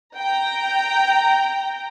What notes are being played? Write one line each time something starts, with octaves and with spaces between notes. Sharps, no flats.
G5 A#5